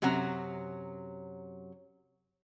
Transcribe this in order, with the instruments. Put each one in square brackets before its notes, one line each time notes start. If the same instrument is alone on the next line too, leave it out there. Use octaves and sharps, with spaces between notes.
[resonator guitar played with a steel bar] F#2 C3 F#3 F#5 A#5